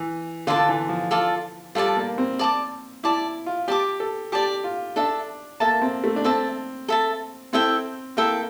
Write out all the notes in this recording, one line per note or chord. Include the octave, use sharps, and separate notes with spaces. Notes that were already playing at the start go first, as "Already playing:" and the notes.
Already playing: E3
D3 F4 A4 D5 A5
E3
F3
F4 A4 D5 A5
G3 F4 A4 D5 A5
A#3
C4
D5 A5 D6
E4 D5 A5 D6
F4
G4 D5 A5 D6
A4
G4 D5 A5 D6
F4
D4 A4 E5 A5
A#3 A4 E5 A5
C4
A3
D4
C4 A4 E5 A5
A4 E5 A5
C4 E4 A4 E5 G5
A#3 E4 A4 E5 G5